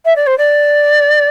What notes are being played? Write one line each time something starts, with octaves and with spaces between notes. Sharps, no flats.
E5
D5
C5
D5